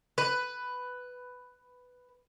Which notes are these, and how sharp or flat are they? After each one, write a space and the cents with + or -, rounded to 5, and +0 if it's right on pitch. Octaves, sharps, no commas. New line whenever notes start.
B4 +5